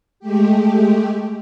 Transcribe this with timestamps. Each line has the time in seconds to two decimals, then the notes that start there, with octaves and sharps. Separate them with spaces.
0.20 G#3 A3 G4